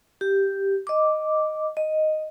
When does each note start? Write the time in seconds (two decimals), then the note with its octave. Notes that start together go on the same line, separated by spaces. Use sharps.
0.21 G4
0.87 D#5 D6
1.77 D#5